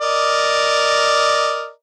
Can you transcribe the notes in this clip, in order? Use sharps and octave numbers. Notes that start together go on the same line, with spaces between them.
A#4 D5 D#5